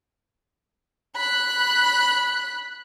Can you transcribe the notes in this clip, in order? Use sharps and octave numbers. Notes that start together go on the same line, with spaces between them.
B5 F#6